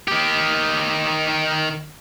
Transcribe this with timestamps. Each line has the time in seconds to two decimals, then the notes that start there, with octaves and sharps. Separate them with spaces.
0.08 D#3 G4